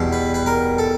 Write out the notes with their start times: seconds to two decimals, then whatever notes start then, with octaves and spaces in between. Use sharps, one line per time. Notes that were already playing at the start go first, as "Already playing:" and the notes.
Already playing: E2 B2 G3
0.13 B4
0.34 B4
0.46 A#4
0.78 A4